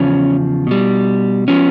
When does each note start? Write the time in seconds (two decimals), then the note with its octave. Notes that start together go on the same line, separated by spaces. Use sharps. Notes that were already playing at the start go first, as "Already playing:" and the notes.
Already playing: E2 C#3 F3 C#4
0.67 B2 G3
1.48 F3 B3 C#4